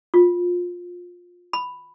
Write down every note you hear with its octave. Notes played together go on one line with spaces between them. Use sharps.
F4
B5